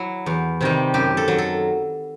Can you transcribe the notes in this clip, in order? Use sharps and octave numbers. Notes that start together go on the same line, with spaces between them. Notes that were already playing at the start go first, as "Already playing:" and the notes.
Already playing: F#3 E4
E2
C3 D#3 G3
F#2 G4
A4
F#3
A4